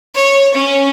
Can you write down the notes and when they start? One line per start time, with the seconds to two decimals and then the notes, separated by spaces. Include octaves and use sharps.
0.15 C#5
0.54 C#4